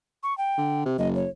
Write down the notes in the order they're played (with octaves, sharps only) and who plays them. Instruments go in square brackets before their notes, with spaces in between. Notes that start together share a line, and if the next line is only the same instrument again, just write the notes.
[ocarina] C#6
G5
[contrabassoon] D3
C3
[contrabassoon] F#1 [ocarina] D#5
[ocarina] C#5